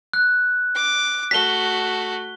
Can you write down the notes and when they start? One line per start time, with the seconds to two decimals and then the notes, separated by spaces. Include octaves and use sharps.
0.13 F#6
0.75 D6
1.31 A3 F#4 B6 G7